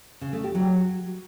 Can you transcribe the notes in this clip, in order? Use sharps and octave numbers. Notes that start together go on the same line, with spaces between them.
C#3
A3
G4
F#3